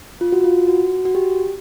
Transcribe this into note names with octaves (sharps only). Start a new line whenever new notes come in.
F4
F#4
F4
F#4
F#4
G4